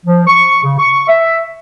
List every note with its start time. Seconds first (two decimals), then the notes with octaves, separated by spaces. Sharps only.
0.06 F3
0.27 C#6
0.63 C#3
0.79 C#6
1.08 E5